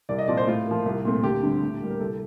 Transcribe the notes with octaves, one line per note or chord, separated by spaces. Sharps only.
C2 D5
D#5
A#2 F3 C4 D5
C5
A2 F4
F3 A#3
C2
A#2 A3 C4
D2 G4
D3 G3 C4
A2
G3 A#3
A#4
C2 A4